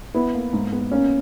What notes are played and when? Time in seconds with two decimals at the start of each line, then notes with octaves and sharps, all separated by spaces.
0.14 B3 E4
0.34 A#3
0.53 G#2
0.72 B3
0.91 A#3 C#4